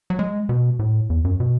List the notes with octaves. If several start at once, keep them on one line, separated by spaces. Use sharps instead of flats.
F#3
G#3
B2
A2
E2
F#2
B2